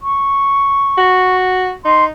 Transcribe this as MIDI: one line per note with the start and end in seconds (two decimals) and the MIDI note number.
0.01 1.36 85
0.98 1.74 66
1.85 2.10 63
1.85 2.05 84